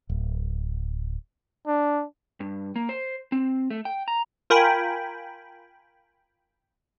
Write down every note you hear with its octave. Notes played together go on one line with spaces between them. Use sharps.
D1
D4
G2
A#3
C5
C4
A3
G5
A#5
F4 A#4 G5 G#5 B5